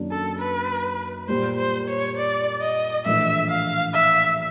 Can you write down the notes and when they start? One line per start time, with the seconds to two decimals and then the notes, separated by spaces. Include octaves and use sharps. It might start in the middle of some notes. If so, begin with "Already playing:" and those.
Already playing: F#2 D#3 F#3 A#3 D4
0.11 A4
0.39 B4
1.28 A#2 G3 A#3 C5
1.58 C5
1.88 C#5
2.17 D5
2.61 D#5
3.05 A#1 A2 E3 E5
3.50 F5
3.94 E5